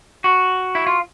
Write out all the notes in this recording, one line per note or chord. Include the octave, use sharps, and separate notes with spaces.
F#4
E4
F4